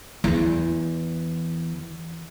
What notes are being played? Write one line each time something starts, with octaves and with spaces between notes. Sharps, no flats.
E2 E3